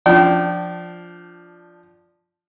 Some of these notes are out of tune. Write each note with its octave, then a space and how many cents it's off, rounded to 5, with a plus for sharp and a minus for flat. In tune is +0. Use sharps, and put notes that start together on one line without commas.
F3 +0 D4 +0 G5 -30